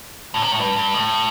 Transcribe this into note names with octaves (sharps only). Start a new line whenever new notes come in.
A2
C3
A2
G2
G2
A2